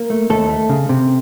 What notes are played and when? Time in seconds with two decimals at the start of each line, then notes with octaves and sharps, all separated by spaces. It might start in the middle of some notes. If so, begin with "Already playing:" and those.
Already playing: A#3 A#4
0.10 A3
0.30 D#2 A3 A4
0.49 A3
0.69 C#3
0.89 C3